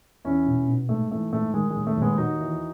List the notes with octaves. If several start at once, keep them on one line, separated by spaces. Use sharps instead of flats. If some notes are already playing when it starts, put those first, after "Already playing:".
E2 C#4 E4
B2
B2
G#2 A3
E3 A3
G#2 A3
D#3 G#3
G#3
D#2
A3
D#2 G#3 B3
D#2 D#4 F#4
E3